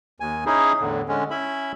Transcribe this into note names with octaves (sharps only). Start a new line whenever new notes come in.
D#2 G#5
C#4 D#4 E4 G#4
E2 A2 D3
D3 G#3 C#4
C#4 E4 E5 B5